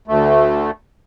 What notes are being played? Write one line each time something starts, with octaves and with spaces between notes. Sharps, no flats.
D2 A3